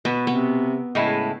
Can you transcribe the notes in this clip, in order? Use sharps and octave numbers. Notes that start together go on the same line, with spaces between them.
B2 B3
C3 B3
A2 C#3 G#3 E4